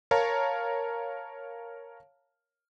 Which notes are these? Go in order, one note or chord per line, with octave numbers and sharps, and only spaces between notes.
A#4 C#5 F5 A5 A#5